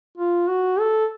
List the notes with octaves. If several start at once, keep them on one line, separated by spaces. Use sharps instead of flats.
F4
F#4
A4